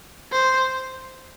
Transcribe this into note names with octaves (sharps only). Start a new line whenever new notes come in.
C5